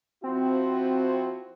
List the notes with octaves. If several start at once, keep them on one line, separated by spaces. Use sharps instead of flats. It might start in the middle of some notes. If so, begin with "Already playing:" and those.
F3 C4 E4 F#4